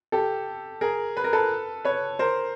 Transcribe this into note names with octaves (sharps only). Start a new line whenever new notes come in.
G4 A4
G#4 A#4
B4
A#4
A4 B4
B4 C#5
A#4 C5